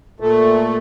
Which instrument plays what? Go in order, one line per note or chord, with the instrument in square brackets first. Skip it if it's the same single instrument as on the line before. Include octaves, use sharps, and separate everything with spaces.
[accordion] A#2 A3